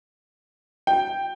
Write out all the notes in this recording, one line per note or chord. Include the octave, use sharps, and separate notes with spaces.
G5